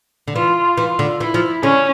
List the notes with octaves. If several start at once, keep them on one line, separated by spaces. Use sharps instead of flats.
D3
E3 F4
E3 F4
D3
E3 E4
F3
D3 C#4